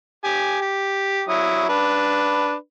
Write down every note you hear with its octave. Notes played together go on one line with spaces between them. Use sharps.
G4 G#5
G4
F#3 E4 D#6
D4 B4